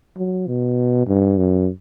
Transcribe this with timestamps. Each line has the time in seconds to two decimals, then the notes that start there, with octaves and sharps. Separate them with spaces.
0.17 F#3
0.47 B2
1.07 G2
1.38 F#2